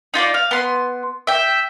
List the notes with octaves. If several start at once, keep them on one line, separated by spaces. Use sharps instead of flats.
D#4 F4 C#5 D5
F5
B3 C6
E5 G5